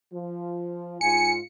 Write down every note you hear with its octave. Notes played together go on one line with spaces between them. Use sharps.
F3 F4
G#2 F4 G#5 C#7